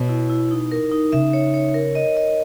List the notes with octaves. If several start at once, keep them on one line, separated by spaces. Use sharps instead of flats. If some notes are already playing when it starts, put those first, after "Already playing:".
Already playing: B2 C#5
E4
E4
D#4
A#4
D#4
C#3 E5
C#5
C#5
A#4
D#5
D#5